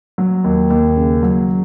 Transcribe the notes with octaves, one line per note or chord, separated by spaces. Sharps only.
F#3
D#2
D#2
C#3
F#3